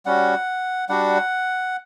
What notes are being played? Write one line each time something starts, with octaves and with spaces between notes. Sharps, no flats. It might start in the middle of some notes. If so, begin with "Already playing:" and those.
G3 C#4 F#4 F#5
G3 D4 F#4 F#5